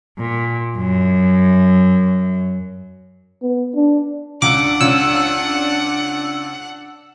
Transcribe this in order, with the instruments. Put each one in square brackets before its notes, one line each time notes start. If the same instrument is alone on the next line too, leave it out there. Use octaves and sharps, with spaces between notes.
[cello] A#2
F#2
[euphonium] B3
D4
[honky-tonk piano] C#2 E6 [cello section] D4 [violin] F#5 [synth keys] D6
[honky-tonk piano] C#2 C#3 [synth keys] E6